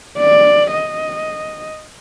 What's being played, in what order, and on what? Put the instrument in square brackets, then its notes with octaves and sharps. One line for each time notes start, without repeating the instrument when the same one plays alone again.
[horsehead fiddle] D5
D#5